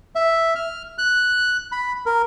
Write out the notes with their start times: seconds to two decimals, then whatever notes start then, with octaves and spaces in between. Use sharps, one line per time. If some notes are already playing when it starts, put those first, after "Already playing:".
0.15 E5
0.55 F6
0.98 F#6
1.72 B5
2.06 A#4